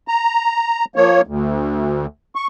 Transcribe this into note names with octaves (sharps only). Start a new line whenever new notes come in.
A#5
F3 A#3 C#5
D2
C#6